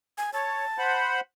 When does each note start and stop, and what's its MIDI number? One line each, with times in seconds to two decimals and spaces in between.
0.18 0.31 80
0.33 0.65 73
0.33 0.99 81
0.78 1.20 72
0.78 1.20 78
0.78 1.20 83